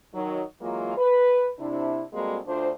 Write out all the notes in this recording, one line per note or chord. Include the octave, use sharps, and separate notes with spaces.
D#3 F#3 D#4
E3 F#3 G#3 A#3 F4
B4
C3 D4 E4
G3 G#3 A#3 C4 F#4 A4
D2 D4 F4 C5